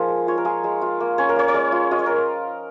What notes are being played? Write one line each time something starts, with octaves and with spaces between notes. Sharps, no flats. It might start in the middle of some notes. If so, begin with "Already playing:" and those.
Already playing: F3 A#3 D#4 F4 G#4 A#4
G#3
F4 C#5
A#4
F4 G#4
G#3
F4
A#3
C#4 C#5
A#4
A#3 C#5
C#5
G#3 A#4
F4
F4 D#5
C#5
A#4